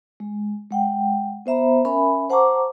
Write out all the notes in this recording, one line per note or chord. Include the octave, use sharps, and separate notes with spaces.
G#3
G#3 F#5 G5
B3 C5 E5 A#5 B5
C#4 A#4 E5 G#5 B5
C5 F#5 A5 A#5 C#6 D6